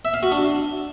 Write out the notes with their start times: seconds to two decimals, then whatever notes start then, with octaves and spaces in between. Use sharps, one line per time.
0.05 E5
0.14 F5
0.23 F#4
0.32 D4